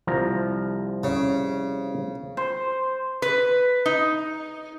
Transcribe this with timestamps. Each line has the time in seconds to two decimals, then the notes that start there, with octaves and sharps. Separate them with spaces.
0.07 C2 F3 A#5
1.03 C#3
2.37 C5
3.22 B4
3.86 D#4